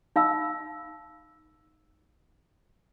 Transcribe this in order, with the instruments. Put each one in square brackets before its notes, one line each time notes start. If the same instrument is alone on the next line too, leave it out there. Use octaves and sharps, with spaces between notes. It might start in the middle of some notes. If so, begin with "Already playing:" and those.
[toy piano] D#4 F5 B5 E6